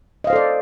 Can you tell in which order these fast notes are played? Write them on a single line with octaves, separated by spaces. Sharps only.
D#5 F5 C5 A4 D5